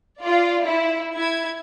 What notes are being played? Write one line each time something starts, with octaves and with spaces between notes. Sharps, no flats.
F4 D5
E4
E4 G#6